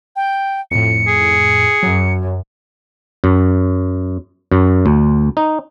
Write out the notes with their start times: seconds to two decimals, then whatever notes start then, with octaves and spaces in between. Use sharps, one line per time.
0.16 G5
0.71 F2 A2 C#7
1.08 G#4
1.83 F#2 F#3
3.24 F#2
4.52 F#2
4.86 D2
5.37 D#4